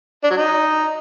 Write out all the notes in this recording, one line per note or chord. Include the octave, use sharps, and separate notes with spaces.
D4
F#3
D#4